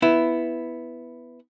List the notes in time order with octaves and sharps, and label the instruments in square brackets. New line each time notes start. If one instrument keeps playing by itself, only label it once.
[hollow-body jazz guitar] B3 E4